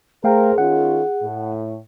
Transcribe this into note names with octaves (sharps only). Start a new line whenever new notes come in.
A3 G#4 A#4 C5 F5 G5
D#3 C#4 F4 F#5
A2